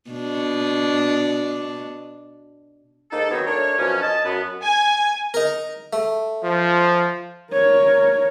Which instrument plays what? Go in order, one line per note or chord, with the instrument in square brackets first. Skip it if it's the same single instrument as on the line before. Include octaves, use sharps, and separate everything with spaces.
[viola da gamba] B2 D4
[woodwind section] G#2 A#3 D#4 A4
D#3 F#3 B3 C4 C#5 D#5
A3 D4 A#4 C#5
F#2 B2 F3 C#4
D#5 A5
F#2 B3
[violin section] G#5
[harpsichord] D#4 A#4
A3
[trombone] F3
[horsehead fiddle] A#4 C#5